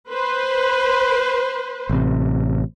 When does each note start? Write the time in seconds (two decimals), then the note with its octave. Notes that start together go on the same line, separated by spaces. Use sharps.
0.10 B4 C5
1.89 A1 C3